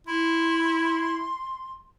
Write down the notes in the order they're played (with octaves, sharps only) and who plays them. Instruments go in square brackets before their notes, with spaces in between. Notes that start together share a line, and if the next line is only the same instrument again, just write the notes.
[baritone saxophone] E4 [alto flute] C6